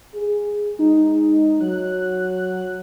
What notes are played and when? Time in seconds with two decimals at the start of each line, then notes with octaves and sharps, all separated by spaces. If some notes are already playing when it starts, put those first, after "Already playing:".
0.15 G#4
0.79 G#3 D#4
1.61 F#3 F#6